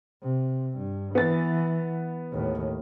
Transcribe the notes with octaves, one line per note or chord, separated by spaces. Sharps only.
C3
G2
E3 B3 A6
D#2 A2